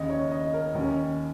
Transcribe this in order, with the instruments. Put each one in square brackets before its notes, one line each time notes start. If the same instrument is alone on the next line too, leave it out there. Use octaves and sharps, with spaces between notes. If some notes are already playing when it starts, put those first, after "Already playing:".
Already playing: [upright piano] D#2 C#3 D#5
C#5
D#5
A#4
D#2 D#3 C#4